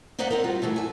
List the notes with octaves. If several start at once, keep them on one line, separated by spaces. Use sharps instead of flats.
A#3 D#4 C5 D5 E5 F#5
C4 D#4 A#4
G3 F4 F#4
E3 F#3 A3 E4
A4 G#5